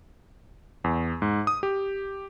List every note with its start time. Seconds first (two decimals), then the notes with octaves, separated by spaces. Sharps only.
0.84 E2
1.22 G#2
1.47 D#6
1.63 G4